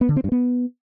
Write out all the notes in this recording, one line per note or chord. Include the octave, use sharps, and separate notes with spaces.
B3
D3
C4
G2
B3